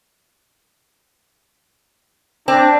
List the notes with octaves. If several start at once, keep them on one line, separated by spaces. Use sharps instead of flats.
C4 D4